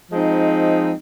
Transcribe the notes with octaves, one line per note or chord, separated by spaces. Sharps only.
F3 G#3 C4 D#4